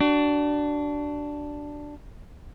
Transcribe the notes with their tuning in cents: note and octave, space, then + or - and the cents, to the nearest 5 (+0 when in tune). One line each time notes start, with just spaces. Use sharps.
D4 +0 F#4 +35